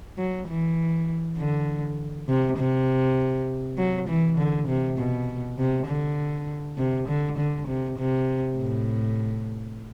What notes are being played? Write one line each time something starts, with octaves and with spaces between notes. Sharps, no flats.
F#3
E3
D3
C3
C3
F#3
E3
D3
C3
B2
C3
D3
C3
D3
D3
C3
C3
A2